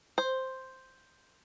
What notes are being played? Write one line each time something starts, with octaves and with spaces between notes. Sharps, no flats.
C5